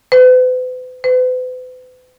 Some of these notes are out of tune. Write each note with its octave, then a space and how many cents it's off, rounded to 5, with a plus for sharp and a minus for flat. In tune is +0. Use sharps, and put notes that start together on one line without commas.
B4 +45
B4 +45